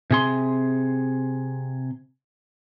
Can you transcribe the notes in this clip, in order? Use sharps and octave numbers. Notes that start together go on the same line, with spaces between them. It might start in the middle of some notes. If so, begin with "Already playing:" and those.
C3 G#4 C6